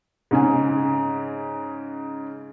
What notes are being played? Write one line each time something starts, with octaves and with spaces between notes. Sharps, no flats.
G#2 C#3 G#5